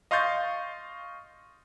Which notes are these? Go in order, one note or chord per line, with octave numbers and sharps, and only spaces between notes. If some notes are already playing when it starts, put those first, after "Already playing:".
D#5 F5 C6 C#6 G6 A6